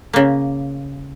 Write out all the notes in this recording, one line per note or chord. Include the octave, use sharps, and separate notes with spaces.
C#3 A#3